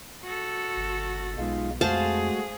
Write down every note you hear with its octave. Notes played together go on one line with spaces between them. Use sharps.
F#4 A4
G1
B1 B2 G#3 D#4 F4
F2 G#3 A3 F#4 G#4 C5 F5 A5